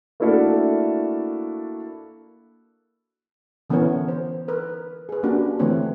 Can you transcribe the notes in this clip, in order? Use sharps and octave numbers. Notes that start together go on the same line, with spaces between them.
A3 A#3 D4 E4 F#4 A4
D3 E3 B3 C#4 A#4 C#5
C5
A#4 B4
G#4 B4
A#3 C#4 D4 F#4 G4
D3 E3 A3 C4 B4 C#5